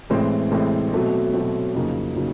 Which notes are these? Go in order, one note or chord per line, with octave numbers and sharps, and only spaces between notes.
A1 A2 E3 G#3 C4
A1 A2 E3 G#3 C4
B2 F#3 A3 C4
B2 F#3 A3 C4
F2 C#3 F#3 A#3 D#4
C#3 F#3 A#3 D#4